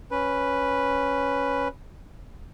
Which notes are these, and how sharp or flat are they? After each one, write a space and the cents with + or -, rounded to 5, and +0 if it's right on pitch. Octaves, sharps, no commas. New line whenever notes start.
C#4 +0 B4 +0